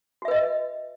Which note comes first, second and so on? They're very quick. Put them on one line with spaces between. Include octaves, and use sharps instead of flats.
F#4 E5 B4 D#5